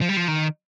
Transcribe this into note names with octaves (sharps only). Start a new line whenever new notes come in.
F3
G3
F3
D#3